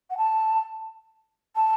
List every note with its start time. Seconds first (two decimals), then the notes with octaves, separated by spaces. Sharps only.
0.10 F#5
0.17 A5
1.56 A5